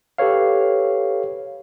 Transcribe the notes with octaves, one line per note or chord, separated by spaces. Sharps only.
G4 A4 B4 C#5 F5